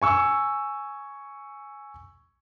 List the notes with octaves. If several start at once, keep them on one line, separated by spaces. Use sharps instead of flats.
G#5 C#6 E6